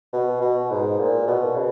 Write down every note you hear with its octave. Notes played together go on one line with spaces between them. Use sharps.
B2
B2
G#2
A#2
B2
C#3